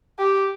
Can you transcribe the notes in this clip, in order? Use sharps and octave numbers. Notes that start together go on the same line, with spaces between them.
G4